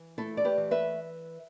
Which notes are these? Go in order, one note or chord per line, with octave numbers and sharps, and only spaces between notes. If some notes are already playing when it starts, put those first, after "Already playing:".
Already playing: E3
A3 E4 A4
D5
G4 B4
E3
B4 E5